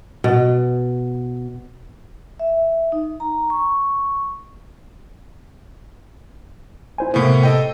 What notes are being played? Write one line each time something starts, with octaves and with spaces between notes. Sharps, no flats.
B2
E5
D#4
A#5
C#6
E4 C5 G#5
A2 C3 A#3 B3 C5
A4 D#5 G5